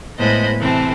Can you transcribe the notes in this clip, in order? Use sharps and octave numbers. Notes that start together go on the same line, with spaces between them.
A2 G#3 B3 C5 D#5 B5
C3 E3 C4 A4